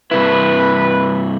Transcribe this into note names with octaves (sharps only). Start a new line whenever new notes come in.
G2 C3 E4 B4